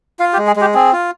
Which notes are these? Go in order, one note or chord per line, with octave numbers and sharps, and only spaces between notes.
F4 F5
G4
G#3
G#4
G#3 G4
C4 G#4
F4